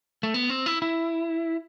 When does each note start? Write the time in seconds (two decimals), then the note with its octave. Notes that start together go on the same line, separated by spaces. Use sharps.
0.23 A3
0.34 B3
0.49 C4
0.66 E4
0.82 E4